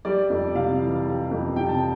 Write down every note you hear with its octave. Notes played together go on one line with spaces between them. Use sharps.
G3 D5
F2
C3 F5
E3
G3
F2
C3 G5
A5